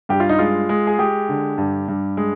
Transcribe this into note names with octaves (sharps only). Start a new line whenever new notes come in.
G2 G4
F4
D#4
G#3 F4
G#3
G#4
G#3 G4
D3
G2
G2
G#3